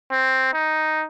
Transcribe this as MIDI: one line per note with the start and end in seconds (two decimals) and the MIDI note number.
0.12 0.52 60
0.53 1.06 63